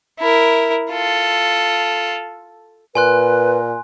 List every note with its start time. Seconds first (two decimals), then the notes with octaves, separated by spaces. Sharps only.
0.19 E4 A#4
0.91 F4 A4
2.95 A#2 B4 G#5 C6 F#6